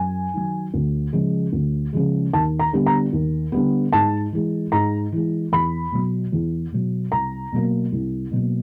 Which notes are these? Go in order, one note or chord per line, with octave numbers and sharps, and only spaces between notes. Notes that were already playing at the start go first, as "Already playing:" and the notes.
Already playing: F#2 G#5
D#3 F#3
D2
C#3 F3 G#3
D2
C#3 F3 G#3
D#2 A5
A#5
D3 G3 B3
A#5
D#2
D3 G3 B3
G#2 A5
E3 G#3
G#2 A#5
E3 G#3
E2 B5
B2 F#3
E2
B2 F#3
C2 A#5
B2 F#3 A#3
C2
B2 F#3 A#3